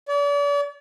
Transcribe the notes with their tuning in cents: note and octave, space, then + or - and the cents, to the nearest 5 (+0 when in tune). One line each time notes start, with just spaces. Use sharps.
D5 -40